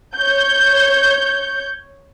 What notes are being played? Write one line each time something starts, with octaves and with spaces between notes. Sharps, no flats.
C#5 G6